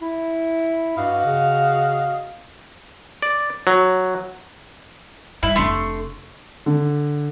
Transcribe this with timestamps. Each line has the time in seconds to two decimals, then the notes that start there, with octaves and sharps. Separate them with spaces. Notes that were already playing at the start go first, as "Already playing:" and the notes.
0.02 E4
0.97 G2 F#4 D#5 F5
1.25 C#3
3.22 D5
3.67 F#3
5.43 G2 E4
5.56 F1 A3 D4 C6
6.66 D3